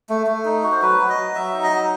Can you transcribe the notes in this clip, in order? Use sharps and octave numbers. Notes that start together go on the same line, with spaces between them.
A3
A3
D#4
F#4
C5
F#3 B4
F#3
D#5
F#3
F#3 E5
D#4
D#5
F#3